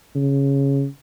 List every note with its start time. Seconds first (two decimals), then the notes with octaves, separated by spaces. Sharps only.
0.15 C#3